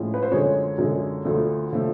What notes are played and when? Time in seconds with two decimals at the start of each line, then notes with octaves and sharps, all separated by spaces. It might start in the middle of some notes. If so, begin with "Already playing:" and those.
Already playing: A2 F3 G#3 C#4
0.14 B4
0.23 C5
0.32 F#2 D3 F3 G#3 C#5
0.78 F#2 D3 F3 G#3
1.25 D2 D3 F3 A3
1.72 D3 F3 A3